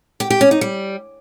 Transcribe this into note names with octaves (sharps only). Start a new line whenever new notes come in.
G4
G4
C#4
D#4
G3